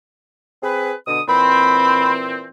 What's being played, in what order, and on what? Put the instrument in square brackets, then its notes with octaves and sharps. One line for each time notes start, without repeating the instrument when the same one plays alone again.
[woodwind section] C4 G#4 B4
B2 D3 D#6
[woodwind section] A#2 E3 C4 [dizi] B5